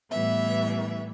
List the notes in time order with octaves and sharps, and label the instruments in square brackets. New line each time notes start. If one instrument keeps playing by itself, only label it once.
[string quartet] A2 E3 G3 B3 E5